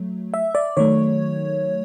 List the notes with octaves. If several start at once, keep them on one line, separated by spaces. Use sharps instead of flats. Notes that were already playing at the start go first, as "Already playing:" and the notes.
Already playing: F#3 A3
E5
D5
D#3 F#3 A3 C#5